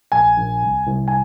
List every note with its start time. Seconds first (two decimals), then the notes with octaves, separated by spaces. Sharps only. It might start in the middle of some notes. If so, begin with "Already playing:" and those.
0.12 A#1 G#5
0.38 A#1
0.63 C2
0.88 C2
1.08 G#5